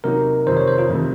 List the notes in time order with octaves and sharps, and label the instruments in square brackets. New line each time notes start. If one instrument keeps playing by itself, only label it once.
[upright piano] C3 F#3 A#3 D#4 [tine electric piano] A#4
[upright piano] F2 C3 D#3 [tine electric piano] C5
[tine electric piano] C#5
C5
F4
[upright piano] F2 C3 D#3 A3